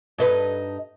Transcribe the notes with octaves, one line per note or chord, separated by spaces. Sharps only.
G2 D#4 B4